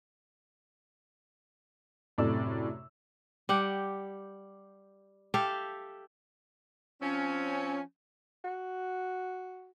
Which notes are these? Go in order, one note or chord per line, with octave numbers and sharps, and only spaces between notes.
F#2 A2 C3 A4 D5 E6
G3 G4 F#5
G4 A4 E5 F5
F3 C4 C#4
F#4